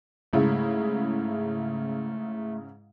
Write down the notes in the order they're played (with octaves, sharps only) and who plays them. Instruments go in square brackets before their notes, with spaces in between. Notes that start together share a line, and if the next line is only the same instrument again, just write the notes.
[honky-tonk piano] G#2 C#3 E4 [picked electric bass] A3